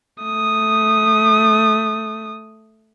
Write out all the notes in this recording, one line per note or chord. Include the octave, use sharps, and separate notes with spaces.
A3 D#6